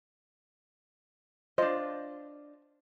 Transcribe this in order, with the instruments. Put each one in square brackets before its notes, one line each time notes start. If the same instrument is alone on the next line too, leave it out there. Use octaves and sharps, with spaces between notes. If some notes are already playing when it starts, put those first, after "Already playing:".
[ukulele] D4 F4 [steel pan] C5 [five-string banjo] D#5